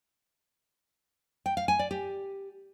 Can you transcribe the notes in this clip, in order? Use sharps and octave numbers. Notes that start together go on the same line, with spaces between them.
G5
F5
G#5
D5
G4